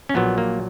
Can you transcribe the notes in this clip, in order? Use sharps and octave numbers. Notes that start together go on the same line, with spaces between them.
C#4
A#1 A#2 F#3 B3
A#3